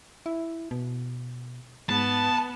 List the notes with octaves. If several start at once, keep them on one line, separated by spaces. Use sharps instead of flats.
E4
B2
G#2 B3 A5